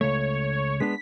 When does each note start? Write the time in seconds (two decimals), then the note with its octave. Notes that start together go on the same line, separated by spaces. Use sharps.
0.01 C#2 A3 C#5
0.80 G#3 B3 D4 B6